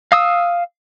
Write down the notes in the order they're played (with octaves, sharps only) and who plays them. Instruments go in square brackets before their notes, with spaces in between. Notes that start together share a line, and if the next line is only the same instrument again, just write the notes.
[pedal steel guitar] F5 D#6 E6